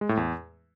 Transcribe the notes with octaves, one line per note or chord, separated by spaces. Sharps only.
G#3
A2
E2